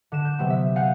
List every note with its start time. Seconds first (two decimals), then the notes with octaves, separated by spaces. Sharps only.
0.12 D3 E7
0.25 G6
0.39 C3 F#3 B3
0.50 E5
0.76 F5 F#5 G#5 G6